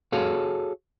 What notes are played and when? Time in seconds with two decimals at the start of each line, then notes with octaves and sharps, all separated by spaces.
0.12 F#4 G#4 A4 C#5 F5